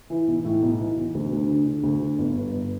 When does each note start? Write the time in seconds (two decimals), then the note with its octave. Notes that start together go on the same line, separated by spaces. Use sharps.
0.10 E3
0.27 B1
0.45 A2
0.62 B1
0.79 E3
0.96 B1
1.14 D2
1.32 D2
1.49 D3
1.66 D3
1.83 D2
2.00 D3
2.18 G1
2.36 G2
2.52 G1